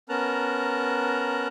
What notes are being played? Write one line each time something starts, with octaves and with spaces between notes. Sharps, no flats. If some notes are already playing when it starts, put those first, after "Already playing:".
B3 C#4 A#4 A5 A#5 F#6